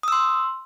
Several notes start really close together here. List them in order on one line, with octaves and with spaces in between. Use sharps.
D#6 E6 C6